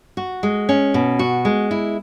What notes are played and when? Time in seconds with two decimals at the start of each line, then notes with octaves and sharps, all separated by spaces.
0.17 F#4
0.43 G#3
0.69 C#4
0.94 B2
1.19 F#4
1.45 G#3
1.71 E4